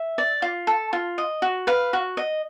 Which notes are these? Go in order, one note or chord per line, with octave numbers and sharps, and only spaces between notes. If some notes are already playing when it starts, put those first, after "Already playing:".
Already playing: E5
D5
F4
A4
F4
D#5
F#4
B4 F5
F#4
D#5